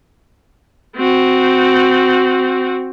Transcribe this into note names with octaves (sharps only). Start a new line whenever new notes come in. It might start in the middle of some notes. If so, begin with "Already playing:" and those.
C4 F#4